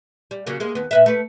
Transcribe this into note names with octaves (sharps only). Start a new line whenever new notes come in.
G3
C#3 F#3 A#3
G#3 A#3
D#2 B3
A#2 B4 E5
A3 B4